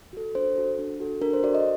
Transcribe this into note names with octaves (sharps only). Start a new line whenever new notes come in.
F#4 A4
D4 C5
F#4 A4
D4
F#4 A4
D4 A#4
C5
F#4 A4 D5
D#5